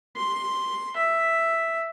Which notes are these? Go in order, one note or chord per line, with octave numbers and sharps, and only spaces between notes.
C6
E5